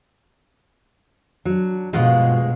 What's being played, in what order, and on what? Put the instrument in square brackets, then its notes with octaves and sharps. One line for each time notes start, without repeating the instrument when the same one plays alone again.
[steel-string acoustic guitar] F#3 D4
[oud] D2 G#3 F4 [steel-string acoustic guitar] G2 F3 F#5 [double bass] B2